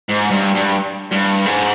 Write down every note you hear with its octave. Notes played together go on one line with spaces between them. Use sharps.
G#2
G2
G2
G2
G#2